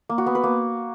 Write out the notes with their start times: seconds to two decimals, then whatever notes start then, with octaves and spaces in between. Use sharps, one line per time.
0.09 A#3
0.18 F#4
0.26 B3
0.35 B4
0.43 A#3